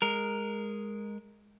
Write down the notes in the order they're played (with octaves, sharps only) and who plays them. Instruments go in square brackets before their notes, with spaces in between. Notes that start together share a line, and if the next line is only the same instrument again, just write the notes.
[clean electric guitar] G#3 A#4